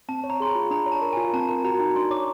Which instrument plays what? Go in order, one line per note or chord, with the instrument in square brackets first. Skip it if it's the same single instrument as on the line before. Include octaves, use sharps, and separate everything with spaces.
[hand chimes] C4 [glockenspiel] A5
[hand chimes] C#5
[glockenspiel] A#5
[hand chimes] G#4 [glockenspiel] C6
[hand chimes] F4 [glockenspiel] B5
[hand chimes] D4 [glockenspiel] A#5
[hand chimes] C#5
[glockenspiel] A5
[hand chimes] A#4
[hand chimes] F4 [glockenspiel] G#5
[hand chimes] C4 [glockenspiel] A5
[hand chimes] A#4 [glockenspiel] A5
[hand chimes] F#4 [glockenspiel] A#5
[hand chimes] D#4
[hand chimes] D4 [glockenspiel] C6
[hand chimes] C#5 [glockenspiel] D6